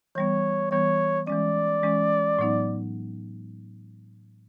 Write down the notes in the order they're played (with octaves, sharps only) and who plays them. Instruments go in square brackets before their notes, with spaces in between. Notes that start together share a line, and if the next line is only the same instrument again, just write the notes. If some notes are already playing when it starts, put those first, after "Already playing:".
[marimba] E3 G3 B3 [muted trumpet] C#5
[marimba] E3 G3 B3 [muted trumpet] C#5
[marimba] E3 G#3 C#4 [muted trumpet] D5
[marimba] E3 G#3 C#4
A2 F#3 B3 D#4